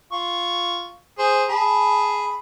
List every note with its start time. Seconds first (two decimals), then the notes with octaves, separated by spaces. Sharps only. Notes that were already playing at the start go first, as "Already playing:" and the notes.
0.12 F4 C#6
1.19 G#4 C5
1.49 G#4 A5 B5